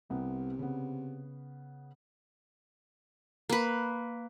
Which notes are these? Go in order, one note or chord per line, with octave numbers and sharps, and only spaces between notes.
C2 C3 B3
C#3 B3
A#3 B4